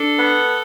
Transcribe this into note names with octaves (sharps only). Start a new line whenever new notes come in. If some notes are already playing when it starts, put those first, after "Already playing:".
Already playing: D4 A4
B3